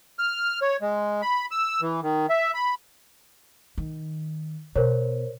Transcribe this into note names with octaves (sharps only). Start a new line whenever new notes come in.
F6
C#5
G#3
B5
E6
E3
D#3
E5
B5
D#3
B2 A#4 C5 C#5